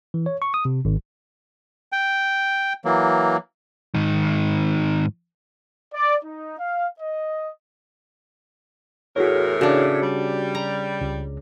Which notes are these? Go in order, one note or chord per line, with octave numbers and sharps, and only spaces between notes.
E3
C#5
C#6
D#6
C3
G#1
G5
E3 F#3 A#3
G#2 D#3
D5
D#4
F5
D#5
E2 A2 F#4 G#4 A#4 C#5
C#3 D4 F#4
G3
A#5
C#2